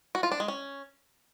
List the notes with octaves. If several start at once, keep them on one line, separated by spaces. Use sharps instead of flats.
F#4
F4
D4
G#3
C#4